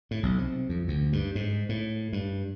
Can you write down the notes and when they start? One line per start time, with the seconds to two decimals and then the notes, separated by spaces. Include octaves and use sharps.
0.11 A2
0.23 B1
0.38 C3
0.69 F2
0.88 D2
1.13 G2
1.35 G#2
1.69 A2
2.13 G2